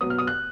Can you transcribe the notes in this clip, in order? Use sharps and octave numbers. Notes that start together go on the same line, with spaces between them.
B2 F#3 B3 D#6
F6
D#6
F#6